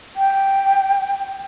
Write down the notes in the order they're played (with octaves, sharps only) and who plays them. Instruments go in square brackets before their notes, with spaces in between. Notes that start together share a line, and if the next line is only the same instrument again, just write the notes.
[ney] G5